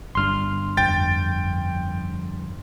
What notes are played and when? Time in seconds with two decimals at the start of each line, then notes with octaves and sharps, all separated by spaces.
0.15 G1 G2 D4 C6 F6
0.77 F2 G5 A6